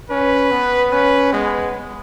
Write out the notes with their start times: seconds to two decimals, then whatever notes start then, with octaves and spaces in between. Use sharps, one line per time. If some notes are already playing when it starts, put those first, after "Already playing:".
0.10 C#4 B4
0.51 B3
0.91 C#4 B4
1.33 G#3 B3